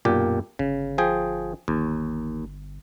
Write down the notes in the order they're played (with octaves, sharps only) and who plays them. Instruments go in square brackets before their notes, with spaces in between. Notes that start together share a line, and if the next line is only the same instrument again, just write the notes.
[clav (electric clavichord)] B1 A#2 G4 [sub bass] F#2
[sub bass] G1 [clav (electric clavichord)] C#3
[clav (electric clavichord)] F3 G#4 G5
[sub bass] G1 [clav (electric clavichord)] D#2